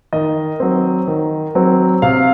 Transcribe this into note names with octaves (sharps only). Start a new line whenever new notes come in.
D#3 D#5
F#3 C4
D#3
F#3 C4
C3 F5